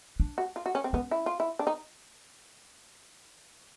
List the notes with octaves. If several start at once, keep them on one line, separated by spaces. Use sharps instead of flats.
D4
F#4
F4
F#4
C#4
C4
B3 C#4
E4
F4
E4
D4
D#4